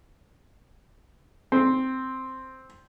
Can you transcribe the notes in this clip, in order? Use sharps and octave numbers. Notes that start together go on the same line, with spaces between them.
C4